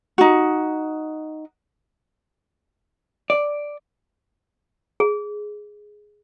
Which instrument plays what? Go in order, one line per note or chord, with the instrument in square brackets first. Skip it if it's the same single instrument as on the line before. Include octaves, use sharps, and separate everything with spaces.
[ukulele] D#4 F#4
[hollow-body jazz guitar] D5
[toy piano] G#4